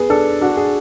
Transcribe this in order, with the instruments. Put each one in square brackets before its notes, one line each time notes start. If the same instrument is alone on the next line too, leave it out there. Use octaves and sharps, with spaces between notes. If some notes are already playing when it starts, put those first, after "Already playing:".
Already playing: [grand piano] B3 [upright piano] G#4
[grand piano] D4 [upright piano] A4
[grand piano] D4 [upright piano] F#4
[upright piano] G#4